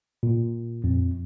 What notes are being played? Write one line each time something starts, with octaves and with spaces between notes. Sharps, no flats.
A#2
F2